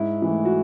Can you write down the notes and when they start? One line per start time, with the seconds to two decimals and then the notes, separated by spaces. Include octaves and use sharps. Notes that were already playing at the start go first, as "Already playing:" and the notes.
Already playing: G#2 E4
0.22 E3 A3
0.45 F#4